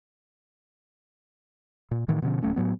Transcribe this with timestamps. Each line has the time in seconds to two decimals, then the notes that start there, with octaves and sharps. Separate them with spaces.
1.91 A#2
2.08 A2 D#3 E3
2.22 B2 D3 F3 C#4
2.43 D1 F#3 A3 C#4
2.56 A2 F#3 B3